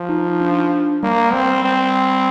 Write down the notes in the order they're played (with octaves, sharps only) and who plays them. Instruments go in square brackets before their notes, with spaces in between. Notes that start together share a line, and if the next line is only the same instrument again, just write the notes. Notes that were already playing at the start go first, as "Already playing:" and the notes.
Already playing: [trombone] F3
[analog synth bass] D#4
D4
[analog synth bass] G3 [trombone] A#3
[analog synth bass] G3 [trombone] C4
[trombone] C4